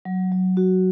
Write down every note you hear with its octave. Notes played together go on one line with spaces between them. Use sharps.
F#3
F#3
F#4